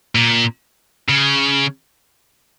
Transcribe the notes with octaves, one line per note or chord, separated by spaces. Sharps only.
A#2
C#3